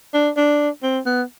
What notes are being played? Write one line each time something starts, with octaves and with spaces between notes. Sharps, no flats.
D4
D4
C4
B3